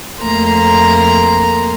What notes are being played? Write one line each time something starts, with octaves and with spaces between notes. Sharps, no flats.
F2 A3 A#3 A#5 C6